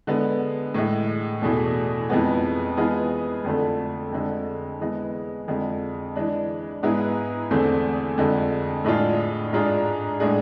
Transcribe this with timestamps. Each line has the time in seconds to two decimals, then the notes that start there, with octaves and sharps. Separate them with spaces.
0.07 D3 G#3 B3
0.74 A2 E3 G#3
1.42 E2 B2 A3 E4 G#4
2.09 F2 E3 G#3 B3
2.77 E3 G#3 B3 F4 G#4
3.44 F2 D3 A3
4.12 F2 D3 G#3
4.80 E3 G#3 B3
5.48 F2 D3 G#3
6.16 E3 G#3 D4
6.83 G#2 G#3 B3 E4 G#4
7.51 E2 D3 A3 C4 G#4
8.18 F2 D3 G#3
8.85 A2 G#3 D4 F4 G#4
9.53 G#2 G#3 D4 F4 G#4
10.20 A2 G#3 D4 G#4